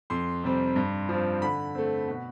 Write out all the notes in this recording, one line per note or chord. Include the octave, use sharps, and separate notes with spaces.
F2 C6
C3 G3 C4
G2
F3 C4
D3 B5
A3 C4
B2